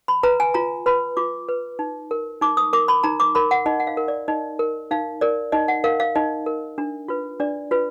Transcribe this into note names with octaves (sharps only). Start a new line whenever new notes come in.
B5
B4 A#5
G#5
F4 A#5
B4 B5
F4 D6
B4
D#4
A#4
D#4 D6
D#6
A#4 D6
B5
D#4 A#5
D6
A#4 B5
F#5
D#4 D#5
F#5
F5
A#4
D5
D#4 D#5
A#4
D#4 F5
A#4 D5
D#4 D#5
F#5
A#4 F5
F5
D#4 D#5
A#4
D4
F4 B4
D4 D5
F4 B4